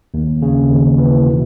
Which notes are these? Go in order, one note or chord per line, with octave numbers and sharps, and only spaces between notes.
D#2
C#3
D#2
E3
B2